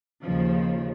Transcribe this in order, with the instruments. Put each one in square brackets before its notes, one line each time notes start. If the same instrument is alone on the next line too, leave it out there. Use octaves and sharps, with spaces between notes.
[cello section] D#2 C#3 F3